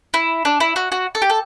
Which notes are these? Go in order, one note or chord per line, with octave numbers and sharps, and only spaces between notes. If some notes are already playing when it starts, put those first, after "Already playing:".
E4
D4
E4
F#4
F#4
A4
G4
A4